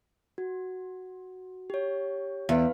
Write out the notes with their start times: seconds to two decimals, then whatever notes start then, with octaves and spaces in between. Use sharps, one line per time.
0.38 F#4
1.70 G4 C#5
2.49 E2 B4 F5